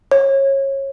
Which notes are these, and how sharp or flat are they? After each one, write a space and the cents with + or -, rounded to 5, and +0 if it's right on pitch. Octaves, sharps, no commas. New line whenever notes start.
C#5 -25